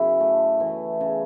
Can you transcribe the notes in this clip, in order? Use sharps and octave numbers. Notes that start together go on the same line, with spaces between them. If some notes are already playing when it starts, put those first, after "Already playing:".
Already playing: F#2 C#3 E4
A3
E3
C#3